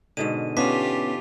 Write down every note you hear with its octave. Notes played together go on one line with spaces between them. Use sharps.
G#2 B2 D3 D#7
B3 C#4 F4 G4 A5 D6 B6